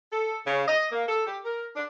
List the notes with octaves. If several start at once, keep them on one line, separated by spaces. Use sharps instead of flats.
A4
C#3
D#5
A#3
A4
G4
A#4
D4